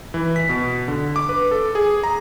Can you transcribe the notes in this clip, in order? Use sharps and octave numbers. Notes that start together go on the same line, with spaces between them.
E3
B6
B2
D3
D6
B4
A4
G#4
A#5